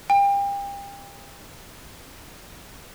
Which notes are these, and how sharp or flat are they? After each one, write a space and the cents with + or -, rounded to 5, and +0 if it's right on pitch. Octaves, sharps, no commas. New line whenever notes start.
G5 +35